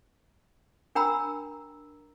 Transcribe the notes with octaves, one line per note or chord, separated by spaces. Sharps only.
D4 A#4 G5 A#5 B5 E6